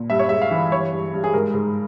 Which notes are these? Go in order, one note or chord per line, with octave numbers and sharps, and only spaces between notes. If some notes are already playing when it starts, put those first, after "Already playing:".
Already playing: A#2
G2 E5
C#5
G#3 E5
F5
E3
G2 C#5
G2
G2
G#4
G#2 A#4
G#2